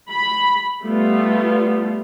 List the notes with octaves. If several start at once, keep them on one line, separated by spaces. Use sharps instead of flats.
B5
G3 A3 B3 F4